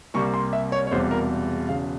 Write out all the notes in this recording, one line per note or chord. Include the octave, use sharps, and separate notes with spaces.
C2 C3 G3 A#3 C#6
C6
E5
C#5
C#5
E1 E2 C3 G3 C5
A#4
E1 E2 C#3 F5